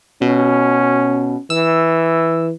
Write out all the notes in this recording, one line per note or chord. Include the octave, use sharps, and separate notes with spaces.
B2 C#4
E3 E6